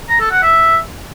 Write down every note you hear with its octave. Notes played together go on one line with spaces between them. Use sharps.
A#5
A4
F#5
E5